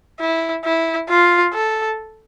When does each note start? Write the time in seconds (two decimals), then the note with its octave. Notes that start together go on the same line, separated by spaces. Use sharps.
0.20 E4
0.64 E4
1.09 F4
1.54 A4